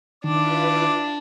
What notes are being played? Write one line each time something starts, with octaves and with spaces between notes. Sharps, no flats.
D#3 D4 E4 F4 B4 D6